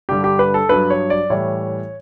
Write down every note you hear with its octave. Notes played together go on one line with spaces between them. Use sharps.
G2 D3 G3 G4
G4
B4
A4
G2 F#3 B4
C#5
D5
A2 E3 G3 C#5